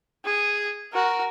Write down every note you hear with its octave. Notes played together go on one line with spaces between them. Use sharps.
G#4
F#4 A#4